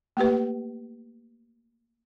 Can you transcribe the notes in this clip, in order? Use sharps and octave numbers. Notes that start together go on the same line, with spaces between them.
A3 A#3 G4 B4